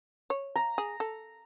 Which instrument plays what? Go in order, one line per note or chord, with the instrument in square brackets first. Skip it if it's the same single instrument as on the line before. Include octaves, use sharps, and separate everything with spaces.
[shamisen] C#5
[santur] A#5
[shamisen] G#4
A4